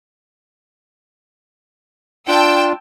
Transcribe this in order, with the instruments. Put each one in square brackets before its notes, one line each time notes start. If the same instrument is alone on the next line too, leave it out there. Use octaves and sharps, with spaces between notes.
[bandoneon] D4 F4 [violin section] G5 A5 E6